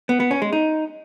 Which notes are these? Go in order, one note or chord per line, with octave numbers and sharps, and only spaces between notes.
B3
B3
C#4
G#3
D#4